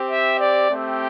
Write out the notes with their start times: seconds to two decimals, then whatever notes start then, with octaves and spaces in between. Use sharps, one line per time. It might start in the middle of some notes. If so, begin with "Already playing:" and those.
Already playing: C4 G4
0.11 E5
0.40 D5
0.70 A3 C4 G4